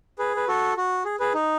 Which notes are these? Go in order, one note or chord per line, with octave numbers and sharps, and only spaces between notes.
G#4 B4
B4
F#4 A4
F#4
G#4
G#4 B4
D#4